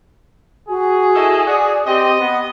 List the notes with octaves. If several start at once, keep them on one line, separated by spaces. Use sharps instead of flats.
F#4 G#4
E4 A4 D#5
F#4 D5
C4 G4 D#5
B3 F#5